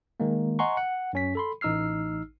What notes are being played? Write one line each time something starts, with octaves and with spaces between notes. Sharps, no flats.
D#3 G#3 A#3
D#5 F#5 G#5 A#5 C6 C#6
F#5
F#2 C#4 B6
A4 B5 C6
A1 D#4 E6 F6 C7